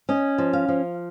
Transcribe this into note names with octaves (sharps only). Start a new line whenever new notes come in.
C#4 D#5
F3
F5
F3